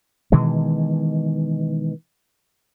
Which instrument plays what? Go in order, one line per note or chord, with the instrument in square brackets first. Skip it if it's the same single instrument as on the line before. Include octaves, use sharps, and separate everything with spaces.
[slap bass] B2 D#3 E3 G#3